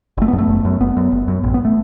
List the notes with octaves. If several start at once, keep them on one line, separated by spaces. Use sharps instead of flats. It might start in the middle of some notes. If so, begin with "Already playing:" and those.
F#1 A3
B3
F#2
A3
F#1
F#2
F#1 B3
F#2
F#1
F#2
A1
B3
A3